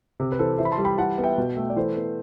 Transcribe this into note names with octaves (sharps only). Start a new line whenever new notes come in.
C3
B4
E3 A4 C5
E3 C5 E5
B5
A5 C6
G3
G5 B5
E3 F#5 A5
B3
E5 G5
B2
A3
D5
E3 A4 C5
B3